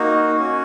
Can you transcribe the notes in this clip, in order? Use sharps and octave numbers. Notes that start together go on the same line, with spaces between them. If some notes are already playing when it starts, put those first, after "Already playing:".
Already playing: A#3 D#4 F#4
C#4 F#4